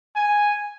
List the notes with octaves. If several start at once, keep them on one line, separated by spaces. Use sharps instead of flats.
G#5